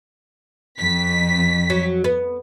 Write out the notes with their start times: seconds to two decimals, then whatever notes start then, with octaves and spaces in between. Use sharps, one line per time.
0.79 F2 B6
1.70 F#3
2.04 B3